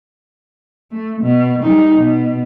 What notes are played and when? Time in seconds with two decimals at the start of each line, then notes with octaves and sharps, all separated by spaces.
0.92 A3
1.22 B2
1.63 G3 D#4
1.97 B2